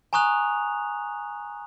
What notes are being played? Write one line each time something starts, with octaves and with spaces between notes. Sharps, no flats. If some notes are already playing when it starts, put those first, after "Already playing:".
G#5 A#5 C#6 D#6 F#6 F7